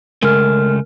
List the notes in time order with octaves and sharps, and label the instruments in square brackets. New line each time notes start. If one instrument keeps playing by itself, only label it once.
[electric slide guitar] C#3 G#3 A3 [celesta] A#4 F6